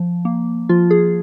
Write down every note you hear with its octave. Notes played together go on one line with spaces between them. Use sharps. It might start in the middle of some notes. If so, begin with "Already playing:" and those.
Already playing: F3
A#3
F3 F4
G#4